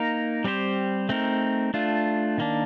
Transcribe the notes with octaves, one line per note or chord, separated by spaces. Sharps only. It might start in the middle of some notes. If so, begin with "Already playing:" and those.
Already playing: A#3 D#4 A#4
G3 C4 G4 C5
A3 C4 D#4 A#4
A3 D4 F4
D#3 A#3 D4